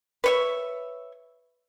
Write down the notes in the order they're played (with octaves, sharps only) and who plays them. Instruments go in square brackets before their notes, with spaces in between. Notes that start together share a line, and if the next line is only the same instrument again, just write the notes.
[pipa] B4 C#5 E5